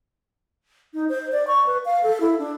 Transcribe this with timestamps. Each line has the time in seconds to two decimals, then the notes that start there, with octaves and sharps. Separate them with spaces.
0.94 D#4
1.09 C5
1.32 D5
1.47 C#6
1.67 B4
1.85 F5
2.03 A4
2.21 E4
2.39 D4